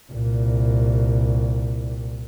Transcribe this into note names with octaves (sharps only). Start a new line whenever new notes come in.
C2 A#2